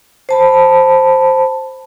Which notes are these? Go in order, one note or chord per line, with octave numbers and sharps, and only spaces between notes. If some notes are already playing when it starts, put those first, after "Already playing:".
C5 A5 B5